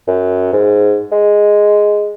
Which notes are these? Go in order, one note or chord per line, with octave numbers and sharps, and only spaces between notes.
F#2
G#2
G#3